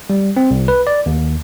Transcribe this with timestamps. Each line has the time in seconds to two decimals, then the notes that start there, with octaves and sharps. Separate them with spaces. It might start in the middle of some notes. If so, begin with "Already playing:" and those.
0.10 G3
0.37 C4
0.51 C2
0.68 B4
0.87 D5
1.06 D#2